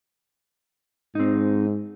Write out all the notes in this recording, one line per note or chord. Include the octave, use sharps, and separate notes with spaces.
G#2 C4 D#4